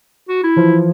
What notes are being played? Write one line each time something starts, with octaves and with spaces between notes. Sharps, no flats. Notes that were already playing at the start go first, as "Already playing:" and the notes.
F#4
E4
E3 F3